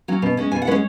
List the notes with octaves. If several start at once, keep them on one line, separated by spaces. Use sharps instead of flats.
F#3 C#4
B2
G#3 C#4
B2 G#5
F#5
G#3 C#4 B4 C#5